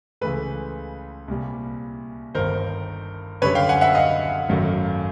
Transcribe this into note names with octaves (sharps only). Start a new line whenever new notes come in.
C#2 C#3 E3 A3 B4
C2 A#2 G3
G1 G2 D#3 A#4 C5
F#2 D3 G3 B4 C#5
F5 G5
F#5 G#5
E5 F#5
D#5 F5
G#1 F#2 D#3 F#3 A3